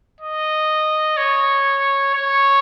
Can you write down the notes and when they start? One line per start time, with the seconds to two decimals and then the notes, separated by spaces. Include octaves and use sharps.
0.21 D#5
1.17 C#5
2.14 C#5